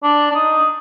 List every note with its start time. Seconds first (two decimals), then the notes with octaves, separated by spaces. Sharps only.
0.03 D4
0.31 D4
0.35 D#4